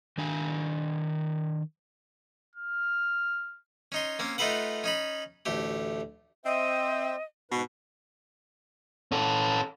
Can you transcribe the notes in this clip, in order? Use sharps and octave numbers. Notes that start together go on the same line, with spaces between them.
D#3 D4 G#5
F6
C#4 D#4 C6
A#3 C4 C#4
A3 D#4 F4 A4 B4 F#5
C#4 D#4 B5
A1 D2 A3 G4
C4 C5 D#5 E5 G5
G#2 B2 B4
C#4 A4